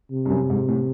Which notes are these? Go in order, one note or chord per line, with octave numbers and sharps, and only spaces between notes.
C3
G2
F#2
G#2
A2